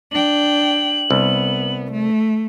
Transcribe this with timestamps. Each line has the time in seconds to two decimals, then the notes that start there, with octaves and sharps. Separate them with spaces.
0.12 D4 G5 F#7
1.11 C2 B3
1.92 A3